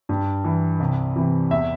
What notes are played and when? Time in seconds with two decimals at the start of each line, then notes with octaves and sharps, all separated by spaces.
0.09 G2
0.44 E3
0.80 C2
1.16 C3 E3
1.51 E2 E5